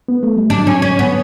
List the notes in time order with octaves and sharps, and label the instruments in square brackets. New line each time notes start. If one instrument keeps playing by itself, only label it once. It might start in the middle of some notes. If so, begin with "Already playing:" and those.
[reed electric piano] B3
A3
G3
[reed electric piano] D3 F#3 [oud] D4
[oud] C#4
C#4
B3